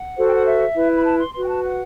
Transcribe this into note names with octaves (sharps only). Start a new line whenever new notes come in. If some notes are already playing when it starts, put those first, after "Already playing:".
Already playing: F#5
F#4 A4 C5
G5
F#5
E5
E4 B4
B5
A5
C6
F#4 B4 C6
G5
A5
F#5